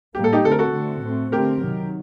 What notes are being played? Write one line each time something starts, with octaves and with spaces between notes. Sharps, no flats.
A2 G3 A#3 G4
A4
D#4 G4
D3 A3 C4 A4
A#4
F#4 A4
D3 A3 C4
A2 A3 C4
D3 A3 C4 G4 A#4
C3 D#3 F#3